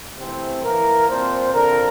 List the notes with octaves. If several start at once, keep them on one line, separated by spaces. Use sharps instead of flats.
C3 E3 A3 C4 C5
E3 A#3 A#4
A#2 F3 C4 C5
D3 F3 C4 A#4